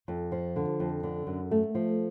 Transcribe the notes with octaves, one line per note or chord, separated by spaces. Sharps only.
F2
F3
D3
F2
D3
F#2
A3
F3